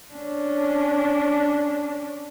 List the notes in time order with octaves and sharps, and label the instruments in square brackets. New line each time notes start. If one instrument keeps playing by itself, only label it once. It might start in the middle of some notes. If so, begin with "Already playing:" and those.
[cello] C#4 D4